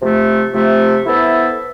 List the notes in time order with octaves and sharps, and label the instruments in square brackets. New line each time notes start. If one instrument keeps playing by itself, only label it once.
[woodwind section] C3 F3 A3
C3 F3 A3
B3 E4 A4 C5 E5